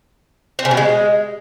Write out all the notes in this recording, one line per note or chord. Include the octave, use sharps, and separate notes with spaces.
C4
C#3
B2
G#3